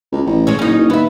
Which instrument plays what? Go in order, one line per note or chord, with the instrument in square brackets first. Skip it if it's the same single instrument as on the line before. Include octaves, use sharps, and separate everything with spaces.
[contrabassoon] C#2
A1
[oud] G#3 G#4 C#5
[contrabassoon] F#1 [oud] C#4 D#4
[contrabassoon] F#1
[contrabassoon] D#2 [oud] B3 E5